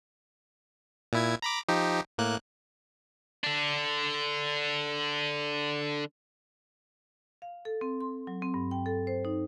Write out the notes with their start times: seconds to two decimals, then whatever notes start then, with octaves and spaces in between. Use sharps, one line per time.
1.13 A#2 E4 G#6
1.42 A#5 B5 D6
1.68 F3 D#4 G4
2.18 A2 A#3 F#6
3.44 D3 D4
7.42 F5
7.65 A4
7.81 C4
8.01 C6
8.27 F#3
8.42 C4
8.54 G2
8.71 G5
8.86 A4
9.07 C5
9.25 D#4